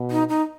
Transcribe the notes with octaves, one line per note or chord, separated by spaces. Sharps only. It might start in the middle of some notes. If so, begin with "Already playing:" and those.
Already playing: B2
D#4
D#4